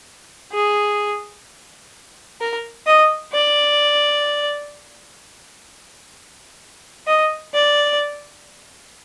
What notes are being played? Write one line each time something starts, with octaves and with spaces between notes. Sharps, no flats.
G#4
A#4
D#5
D5
D#5
D5